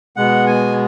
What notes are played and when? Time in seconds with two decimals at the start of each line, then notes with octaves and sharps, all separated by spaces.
0.16 B2 G#3 B3 F#5
0.46 G#5